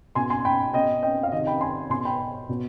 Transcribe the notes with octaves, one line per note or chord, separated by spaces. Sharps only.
B2 G#5 C6
G#5 C6
G5 B5
B2 D#5 G5
D#5 G5
F5
C3 D#3 D#5
G5 B5
G#5 C6
B2 G#5 C6
G5 B5
B2